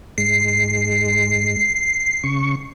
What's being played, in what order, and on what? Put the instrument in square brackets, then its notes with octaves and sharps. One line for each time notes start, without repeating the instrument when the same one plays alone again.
[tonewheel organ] G#2 G#3 [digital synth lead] C7
[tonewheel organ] C#3 C#6